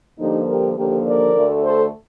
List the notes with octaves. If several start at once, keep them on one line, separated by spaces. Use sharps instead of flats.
G2 D3 F3 A#3 D#4 G4
G4 A#4
D#2 D3 F3 A#3 G4 A#4
A#4 D5
D2 D3 A3
A4 C5